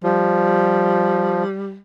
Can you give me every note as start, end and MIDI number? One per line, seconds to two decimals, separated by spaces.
0.03 1.43 53
0.03 1.78 55